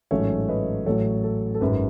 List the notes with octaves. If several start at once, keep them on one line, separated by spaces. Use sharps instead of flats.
A1 G#2 F#3 A3 C#4 C#5 E5
B4 D#5
A1 A2 F#3 A4 C#5
A4
A4
G#1 F#2 D#3 G#3 B4